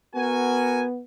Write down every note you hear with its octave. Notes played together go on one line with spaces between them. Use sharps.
B3 F#4 A#4 G#5